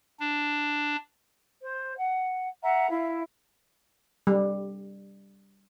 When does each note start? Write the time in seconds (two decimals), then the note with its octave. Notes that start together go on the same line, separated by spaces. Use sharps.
0.20 D4
1.61 C5
1.97 F#5
2.62 E5 F#5 A#5
2.89 E4 E5 F5
4.27 G3